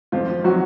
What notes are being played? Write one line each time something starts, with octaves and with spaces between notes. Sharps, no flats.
F2 F3 F4
F3 F#3 F#4